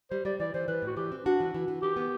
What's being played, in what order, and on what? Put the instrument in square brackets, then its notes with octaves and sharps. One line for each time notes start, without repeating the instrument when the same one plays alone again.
[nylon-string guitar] G3 [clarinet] C5
[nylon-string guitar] G3 [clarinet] D5
[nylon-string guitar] E3 [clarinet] D5
[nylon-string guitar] E3 [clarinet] C5
[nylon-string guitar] E3 [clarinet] B4
[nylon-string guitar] A2 [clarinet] F#4
[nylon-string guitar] E3 [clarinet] G4
[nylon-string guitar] C4
[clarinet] D4 [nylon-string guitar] F#4
[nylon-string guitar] E3
E3
E3
[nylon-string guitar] E3 [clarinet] G4
[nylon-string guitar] B3